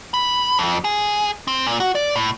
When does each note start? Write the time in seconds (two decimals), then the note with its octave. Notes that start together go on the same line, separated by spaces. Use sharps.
0.14 B5
0.59 F2
0.84 G#4
1.48 C4
1.67 A#2
1.80 F#4
1.95 D5
2.16 A2